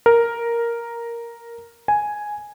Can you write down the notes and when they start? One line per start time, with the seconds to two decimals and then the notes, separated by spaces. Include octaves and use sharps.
0.06 A#4
1.88 G#5